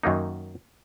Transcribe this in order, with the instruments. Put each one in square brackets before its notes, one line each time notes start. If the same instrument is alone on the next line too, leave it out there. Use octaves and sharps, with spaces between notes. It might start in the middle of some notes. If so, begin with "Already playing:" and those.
[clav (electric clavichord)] F#2 D#3 F#3 A#3 D#4